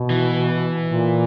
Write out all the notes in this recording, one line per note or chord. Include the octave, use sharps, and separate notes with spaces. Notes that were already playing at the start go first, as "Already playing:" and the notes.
Already playing: B2
E3
A#2